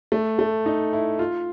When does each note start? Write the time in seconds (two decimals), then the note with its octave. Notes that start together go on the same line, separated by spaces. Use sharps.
0.12 A3
0.39 A3
0.66 D#4
0.93 E4
1.19 F4